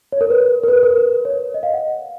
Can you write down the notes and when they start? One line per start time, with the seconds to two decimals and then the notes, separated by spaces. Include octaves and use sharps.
0.12 C#5
0.21 A#4
0.30 B4
0.63 A#4
0.68 B4
0.83 A#4
0.97 B4
1.25 C#5
1.54 D#5
1.63 F5
1.74 F#5